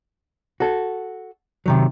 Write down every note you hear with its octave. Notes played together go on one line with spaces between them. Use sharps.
F#4 A4
C3 D#3 F#3